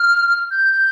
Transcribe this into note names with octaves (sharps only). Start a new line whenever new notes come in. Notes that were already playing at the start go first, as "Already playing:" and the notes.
Already playing: F6
G6